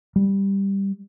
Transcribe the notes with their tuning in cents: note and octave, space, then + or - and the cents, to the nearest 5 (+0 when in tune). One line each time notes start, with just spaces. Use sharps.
G3 +5